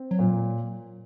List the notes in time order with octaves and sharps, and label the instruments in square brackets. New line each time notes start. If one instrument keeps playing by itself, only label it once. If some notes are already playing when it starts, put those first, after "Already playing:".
Already playing: [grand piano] C4
[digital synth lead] F#3
[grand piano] A#2